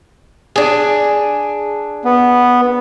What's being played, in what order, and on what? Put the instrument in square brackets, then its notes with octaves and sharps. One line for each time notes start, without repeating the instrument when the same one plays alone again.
[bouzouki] D4 G#4
[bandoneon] B3